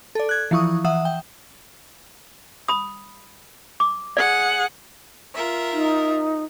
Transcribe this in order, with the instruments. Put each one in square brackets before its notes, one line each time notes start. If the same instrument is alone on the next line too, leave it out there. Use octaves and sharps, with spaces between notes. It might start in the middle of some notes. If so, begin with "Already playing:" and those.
[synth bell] A4 D5
F#6 G#6
E3 F3 E4 C#6 D#6
E3 E5 F#5 D#6
G5
[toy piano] B5 D#6
D6
[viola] G#4 F#5 [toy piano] D5
[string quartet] F4 A#4 E5
[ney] D#4